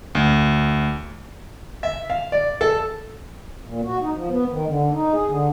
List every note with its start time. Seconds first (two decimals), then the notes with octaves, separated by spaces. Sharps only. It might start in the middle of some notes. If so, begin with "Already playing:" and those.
0.15 D2
1.83 E5
2.10 F5
2.32 D5
2.61 A4
3.65 A#2
3.85 F#4
4.01 D#4
4.15 F3
4.30 B3
4.50 D#3
4.67 D3
4.90 D#4
5.12 G#4
5.28 D3